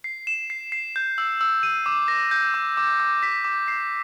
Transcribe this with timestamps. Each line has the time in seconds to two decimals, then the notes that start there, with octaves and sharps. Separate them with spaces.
0.04 C7
0.27 E7
0.50 C7
0.72 C7
0.96 G6
1.18 E6
1.41 E6
1.63 D#7
1.86 D6
2.08 A#6
2.31 G6
2.54 D6
2.77 D6
3.00 D6
3.23 B6
3.44 D6
3.68 C7